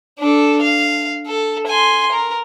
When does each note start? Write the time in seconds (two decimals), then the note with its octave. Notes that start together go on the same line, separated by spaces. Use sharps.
0.19 D4 A4
0.61 F5
1.26 A4
1.67 G#5 C6
2.12 A#4